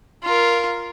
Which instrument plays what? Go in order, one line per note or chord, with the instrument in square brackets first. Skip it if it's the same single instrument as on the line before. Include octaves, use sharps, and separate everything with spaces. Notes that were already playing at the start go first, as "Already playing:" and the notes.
[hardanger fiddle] F4 A#4